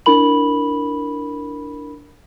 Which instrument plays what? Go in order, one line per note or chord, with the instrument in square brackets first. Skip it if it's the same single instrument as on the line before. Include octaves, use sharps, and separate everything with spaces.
[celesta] D4 E4 A#4 B5 F#7